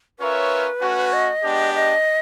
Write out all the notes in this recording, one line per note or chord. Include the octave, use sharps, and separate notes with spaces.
C#4 F4 A#4 B4 C#5 E5
A3 C#4 F#4
D#5
G#3 B3 D4 G4
D#5